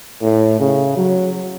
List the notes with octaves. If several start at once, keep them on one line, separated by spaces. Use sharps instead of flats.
A2
C#3
F#3